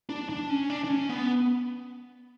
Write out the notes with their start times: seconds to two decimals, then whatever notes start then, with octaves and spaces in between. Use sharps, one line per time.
0.09 D4
0.29 D4
0.50 C#4
0.70 D4
0.84 D4
0.89 C#4
1.09 B3